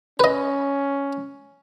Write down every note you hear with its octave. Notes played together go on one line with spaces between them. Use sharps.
C#4 B4 D#5